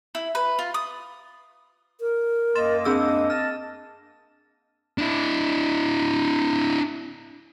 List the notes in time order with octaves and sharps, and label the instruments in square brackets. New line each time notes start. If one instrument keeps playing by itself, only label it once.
[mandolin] E4
B4
F4
D#6
[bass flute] A#4
[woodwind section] F#2 A#3 D#5 [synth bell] C6 A6 E7
[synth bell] C4 G#4 E6 [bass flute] D4
[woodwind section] D#5 A5 [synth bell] F6
[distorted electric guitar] D4 E4